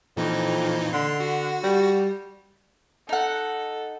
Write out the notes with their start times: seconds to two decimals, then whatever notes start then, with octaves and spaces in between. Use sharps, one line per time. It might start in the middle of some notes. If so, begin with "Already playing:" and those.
0.17 F2 A#2 E3 D#4
0.93 D3 C6
1.20 F#4
1.63 G3
3.09 D#4 A4 F#5